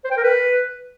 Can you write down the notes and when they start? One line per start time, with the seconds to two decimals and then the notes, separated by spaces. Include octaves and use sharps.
0.04 C5
0.11 G5
0.17 A#4
0.24 B4